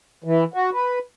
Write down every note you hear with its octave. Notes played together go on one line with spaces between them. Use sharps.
E3
F#4
B4